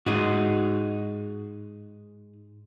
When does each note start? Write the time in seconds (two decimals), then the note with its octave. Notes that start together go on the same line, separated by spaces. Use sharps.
0.06 G#2 G#3 D#4 F#4